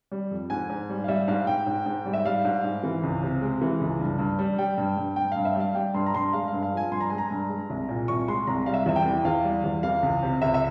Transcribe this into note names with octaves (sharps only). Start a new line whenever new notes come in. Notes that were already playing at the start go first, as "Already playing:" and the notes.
G3
F2
G#2 G#5
G#2
G3
F5
G3 E5
G#2 F5
G#2 G5
G#2
G#2
G3
E5
G3 F5
G#2
G#2
E3
C#2
C3
G#3
E3
C#2
G2
G2
G3
G3 G5
G2
G2
G2 G5
G2 F5
E5
G3 F5
G3 G5
G2 C6
A#5
G2 C6
G#3 F5
G2 F5
F5
F3 G#5
G2 C6
A#5
G#3 G#5
A#5
G2
G#3
C2
A#2
C2 C#6
G#3 C6
C2 A#5
G3 F5
E5
E2 E5
G5
E3
E2 F5
G3
E2
E3 F5
C#2
C3
C#2 E5
E5